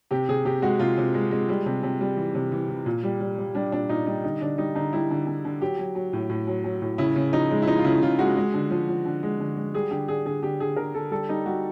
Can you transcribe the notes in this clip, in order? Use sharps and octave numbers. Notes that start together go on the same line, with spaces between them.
C3 G4
C3 G#4
C3 G4
G#3 F#4
C3 F4
C3
G#3
G#3
G3
C3
C3
G3
E3
C3
E3
E3
A#2
G3
G3
G3
G3 D4
A#2 D4
A#2 D#4
G3 D#4
D3 D#4
D3 D4
G3 D#4
D3 D#4
G3 E4
D3
D3
D3
F#3 G4
F#3
F#3
A2
A2
F#3
F#3
A2
C#3 E4
C#3
F3 D#4
G#3
E4
F3 D#4
F4
C#3 E4
C#3 F4
G#3 F#4
G#3
D3
F3
F3
D3
G#3
D3
G#3
G3 G#4
D3 G4
D3 G#4
D3 G#4
D3 G4
D3 G#4
D3 A#4
D3 A4
G3 A4
G3 D#4
G3 F#4